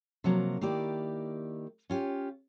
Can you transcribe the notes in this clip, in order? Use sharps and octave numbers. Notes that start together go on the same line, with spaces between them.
C3 F3 F#3 A#3
D#3 A#3 E4 G4 D5
C#4 F4 G4